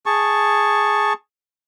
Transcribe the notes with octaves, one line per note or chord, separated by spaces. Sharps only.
G#4 A5 C#6